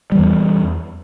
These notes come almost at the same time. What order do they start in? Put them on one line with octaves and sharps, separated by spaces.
G3 E3 E2